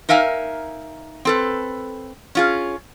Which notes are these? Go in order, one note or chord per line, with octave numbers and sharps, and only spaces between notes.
D#4 A#4 E5 F5 G#5
C4 A4 B4
C#4 F4 G#4